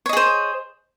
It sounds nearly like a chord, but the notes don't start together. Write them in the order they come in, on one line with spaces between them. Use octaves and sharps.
C#5 D#5 G#4 C5